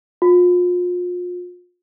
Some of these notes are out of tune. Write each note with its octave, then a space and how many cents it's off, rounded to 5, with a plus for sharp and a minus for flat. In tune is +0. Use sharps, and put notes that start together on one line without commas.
F4 +35